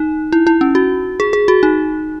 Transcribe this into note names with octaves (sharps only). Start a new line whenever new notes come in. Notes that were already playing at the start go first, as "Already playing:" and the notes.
Already playing: D#4
E4
E4
C#4
F#4
G#4
G#4
F#4
D#4